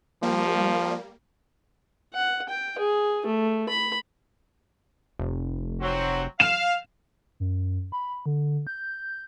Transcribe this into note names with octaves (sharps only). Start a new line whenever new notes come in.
F3 G3 A#3
F#5
G5
G#4
A3
B5
F1
F#3 C4 F#4
F5 E7
F#2
B5
D3
G6